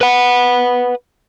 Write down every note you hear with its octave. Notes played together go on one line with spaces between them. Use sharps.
B4 F#5